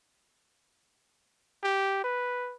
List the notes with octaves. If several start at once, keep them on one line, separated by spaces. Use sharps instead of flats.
G4
B4